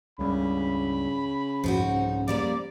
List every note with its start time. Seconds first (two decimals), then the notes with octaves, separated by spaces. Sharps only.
0.19 C#2 G2 C#3 G3 B5
1.64 C2 G#2 F3 D#4 F#4
2.28 F3 G3 A#3 D5